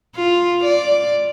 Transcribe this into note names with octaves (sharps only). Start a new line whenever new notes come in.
F4
D5